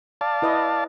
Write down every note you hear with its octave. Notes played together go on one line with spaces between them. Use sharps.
D5 F5 A5
E4 B4 D#5